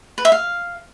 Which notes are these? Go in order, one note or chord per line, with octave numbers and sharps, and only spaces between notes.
B4
E5
F5